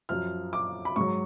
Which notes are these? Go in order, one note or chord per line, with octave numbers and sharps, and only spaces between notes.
F#2 F3 F6
D6
B5
G#2 F#3 C#6